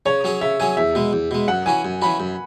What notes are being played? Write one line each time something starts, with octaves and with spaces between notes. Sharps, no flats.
C#3 C#5
F#3 C#4 G#4
C#3 E5
F#3 C#4 G#4 G#5
E2 E5
B2 G#3
E2
B2 G#3
F#2 F#5
E3 C#4 F#4 G#5
F#2
E3 C#4 F#4 B5
F#2